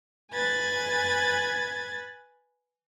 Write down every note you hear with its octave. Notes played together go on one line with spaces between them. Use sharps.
B4 G#5 G#6 A6